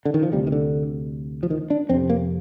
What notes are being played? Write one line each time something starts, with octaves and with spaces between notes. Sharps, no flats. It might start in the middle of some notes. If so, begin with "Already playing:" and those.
D3
D#3
F3
D2 C3 G3
D#3
D3
F3
D#3
D4
F2 C3 C4
A#3